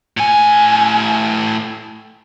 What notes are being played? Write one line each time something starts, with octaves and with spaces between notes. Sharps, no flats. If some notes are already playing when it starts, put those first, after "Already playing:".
A2 G#5